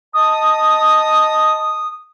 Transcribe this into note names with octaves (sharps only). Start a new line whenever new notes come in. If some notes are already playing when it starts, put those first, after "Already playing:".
D#5 A5 D#6